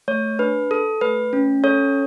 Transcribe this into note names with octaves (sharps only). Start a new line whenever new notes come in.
A3 C#5
D4 B4
A4
A3 B4
C#4
A4 C#5